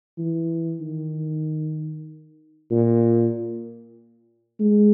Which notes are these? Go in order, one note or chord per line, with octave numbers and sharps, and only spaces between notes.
E3
D#3
A#2
G#3